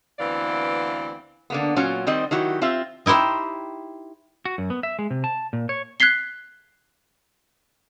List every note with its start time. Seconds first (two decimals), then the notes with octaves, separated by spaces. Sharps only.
0.19 D2 E3 B3 C4 D5 F5
1.50 D3 A#3 B3
1.76 A#2 F#3 C#4 F4
2.07 D#3 G3 C4 C5 D#5
2.31 D#3 F#3 E4 F#4 G4
2.62 C4 F4 G4 E5
3.06 D#4 E4 G4 C5 G5
4.45 F#4
4.58 F#2
4.70 B3
4.83 E5
4.99 G#3
5.11 C3
5.24 A5
5.53 A#2
5.69 C#5
6.00 F#6 G#6 B6 C7 G7